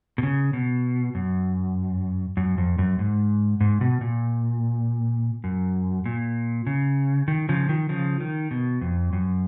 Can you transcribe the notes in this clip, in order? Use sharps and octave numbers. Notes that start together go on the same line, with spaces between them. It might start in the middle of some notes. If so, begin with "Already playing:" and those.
B2
C#3
B2
F#2
F#2
F2
F#2
G#2
G#2
B2
A#2
F#2
A#2
C#3
D#3
C#3 F3
D#3
C#3 F3
D#3
B2
F2
F#2